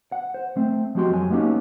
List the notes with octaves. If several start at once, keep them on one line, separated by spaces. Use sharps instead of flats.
F#5
C5
A3 C4
F3 G#3 C4 F#4 G4 C6
F#2 G#3 G#5
G#3 A#3 B3 C#4 D#4 G4